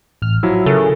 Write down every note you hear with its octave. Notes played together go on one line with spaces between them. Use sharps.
A1 F6
F3 F#3 E4 E5
C#3 A4 A#4